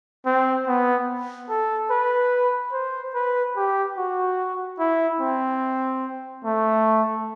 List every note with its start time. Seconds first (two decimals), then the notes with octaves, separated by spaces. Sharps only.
0.26 C4
0.68 B3
1.50 A4
1.91 B4
2.73 C5
3.15 B4
3.56 G4
3.98 F#4
4.79 E4
5.21 C4
6.45 A3